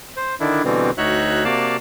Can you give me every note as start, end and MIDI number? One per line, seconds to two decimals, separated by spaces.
0.17 0.35 72
0.40 0.62 50
0.40 0.62 51
0.40 0.62 62
0.40 0.62 64
0.65 0.91 47
0.65 0.91 50
0.65 0.91 52
0.65 0.91 55
0.65 0.91 59
0.65 0.91 60
0.98 1.44 38
0.98 1.44 63
0.98 1.44 66
0.98 1.44 73
0.98 1.44 76
0.98 1.44 90
1.45 1.77 48
1.45 1.77 58
1.45 1.77 66
1.45 1.77 74
1.45 1.77 77
1.45 1.77 81